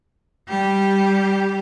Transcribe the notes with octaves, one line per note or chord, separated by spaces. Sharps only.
G3 G4